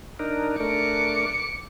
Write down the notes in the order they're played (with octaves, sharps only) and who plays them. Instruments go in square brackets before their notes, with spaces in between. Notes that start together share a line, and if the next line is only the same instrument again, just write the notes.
[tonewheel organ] D4 D#4 A#4
[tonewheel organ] A3 D4 A#4 [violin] D6 C#7